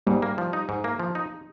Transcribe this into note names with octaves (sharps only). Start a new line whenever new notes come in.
G#2 G3
A#3
F3
D#4
G#2
A#3
F3
D#4